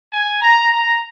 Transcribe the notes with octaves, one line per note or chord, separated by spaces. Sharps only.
G#5
A#5
A#5